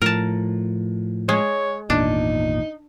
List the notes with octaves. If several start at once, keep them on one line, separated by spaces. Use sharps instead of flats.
A2 F3 A#4 A5
G#3 C#5
G#1 E2 A#2 D4 D#4